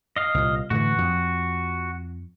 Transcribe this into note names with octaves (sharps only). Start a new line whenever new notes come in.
D#5 F5
C2 A#2
A2 D3 E3 F#4
F2